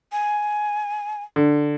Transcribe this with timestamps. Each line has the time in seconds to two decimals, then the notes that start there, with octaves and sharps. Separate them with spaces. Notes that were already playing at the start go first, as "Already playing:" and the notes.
0.12 G#5
1.36 D3